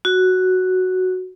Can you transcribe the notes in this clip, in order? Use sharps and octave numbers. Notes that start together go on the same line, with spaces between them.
F#4